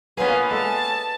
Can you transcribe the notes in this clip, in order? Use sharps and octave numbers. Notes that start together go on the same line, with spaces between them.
A#3 B3 C#4 F4 G#4 B4 E5
G#3 A4 A5